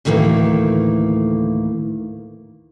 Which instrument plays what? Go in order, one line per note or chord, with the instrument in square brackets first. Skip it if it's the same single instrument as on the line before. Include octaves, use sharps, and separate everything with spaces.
[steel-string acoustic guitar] D2 A2 D#3 E3 A#3